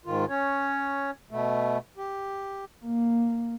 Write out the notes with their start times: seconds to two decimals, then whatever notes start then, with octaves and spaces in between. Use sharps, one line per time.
0.06 G#2 D#3 F4
0.29 C#4 C#5
1.31 B2 A3
1.97 G4
2.85 A#3